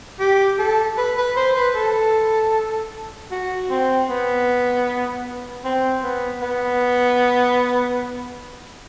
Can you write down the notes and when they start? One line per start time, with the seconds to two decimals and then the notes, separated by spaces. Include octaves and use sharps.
0.19 G4
0.59 A4
0.97 B4
1.17 B4
1.36 C5
1.55 B4
1.75 A4
3.31 F#4
3.70 C4
4.09 B3
5.65 C4
6.03 B3
6.41 B3